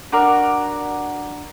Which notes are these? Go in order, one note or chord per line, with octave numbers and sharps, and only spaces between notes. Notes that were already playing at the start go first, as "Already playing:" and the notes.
D4 F#4 A#4 D5